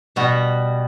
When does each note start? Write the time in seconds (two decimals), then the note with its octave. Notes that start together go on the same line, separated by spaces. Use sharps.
0.16 B2 G3 F#4